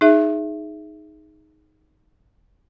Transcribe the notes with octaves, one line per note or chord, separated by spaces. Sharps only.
D#4 G#4 E5